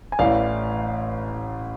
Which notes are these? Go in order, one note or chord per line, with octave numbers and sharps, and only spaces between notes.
G#5
A1 A2 E3 D5 F5